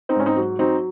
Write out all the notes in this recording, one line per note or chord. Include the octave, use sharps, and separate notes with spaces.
C4 D#4
G#2 C#4
C4 D#4
F#3
F#3 C4 D#4